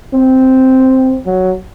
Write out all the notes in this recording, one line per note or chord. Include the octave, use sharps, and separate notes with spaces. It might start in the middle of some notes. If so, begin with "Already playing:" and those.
C4
F#3